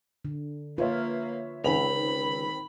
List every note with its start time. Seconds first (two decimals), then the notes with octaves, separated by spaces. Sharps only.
0.25 D3
0.78 A#3 F4 B4 C#5 E5
1.64 C#2 D#3 C4 B5 F7